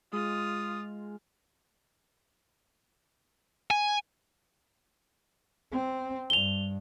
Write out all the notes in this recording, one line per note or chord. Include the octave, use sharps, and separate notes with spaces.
G#3 F4 D#6
G#5
C4
G2 F7 G7